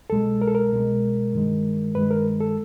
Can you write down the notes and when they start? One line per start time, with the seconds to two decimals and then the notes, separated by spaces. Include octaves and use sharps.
0.10 C2 B2 G#3 A4
0.42 A#4
0.47 A4
0.55 A#4
0.72 C2 B2 G#3
1.33 G2 D#3 G#3
1.95 G2 D#3 G#3 B4
2.11 A#4
2.40 A4